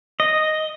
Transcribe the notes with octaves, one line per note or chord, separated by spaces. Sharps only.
D#5